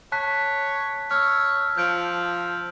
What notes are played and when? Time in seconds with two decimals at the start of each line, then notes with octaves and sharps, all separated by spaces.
0.12 C#5 A5 F#6 B6
1.11 C#5 E6 F6
1.78 F3 G6 D7